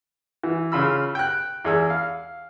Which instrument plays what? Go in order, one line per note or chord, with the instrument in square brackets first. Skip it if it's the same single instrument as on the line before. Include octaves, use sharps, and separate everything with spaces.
[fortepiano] E3
C#3 F4 B5 E6
G5 F#6
E2 G#4 E6
F5